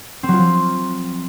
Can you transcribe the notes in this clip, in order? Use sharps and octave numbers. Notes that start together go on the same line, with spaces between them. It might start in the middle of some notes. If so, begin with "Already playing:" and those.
C4
F#3
F4
F3